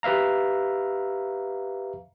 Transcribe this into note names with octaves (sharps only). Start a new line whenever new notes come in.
G4 B4 E5 F5 A#5